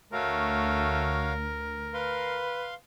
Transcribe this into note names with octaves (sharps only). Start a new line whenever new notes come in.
D2 A3 F#4 A#4 C#5 F5
B4 F5 C6